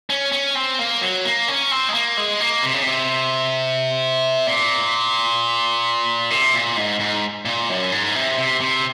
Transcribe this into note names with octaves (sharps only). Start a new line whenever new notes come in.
C#4
C#4
C4
A#3
F#3
A#3
C#4
C4
G#3
A#3
G#3
A#3
C3
C#3
C3
A#2
C3
A#2
G#2
G#2
A#2
F#2
G#2
C3
C3
C3